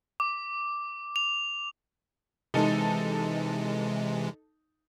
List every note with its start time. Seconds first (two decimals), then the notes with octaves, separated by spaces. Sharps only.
0.20 D6
1.16 F7
2.54 C3 E3 G#3 D#4 A4